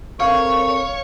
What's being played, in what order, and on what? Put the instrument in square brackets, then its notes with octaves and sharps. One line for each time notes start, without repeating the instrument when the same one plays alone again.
[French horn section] C4 A4 A#4 [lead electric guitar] C#5 [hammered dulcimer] F5 [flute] C#6